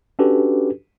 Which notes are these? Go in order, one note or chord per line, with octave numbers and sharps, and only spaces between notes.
C#4 D4 F#4 G4 A4 B4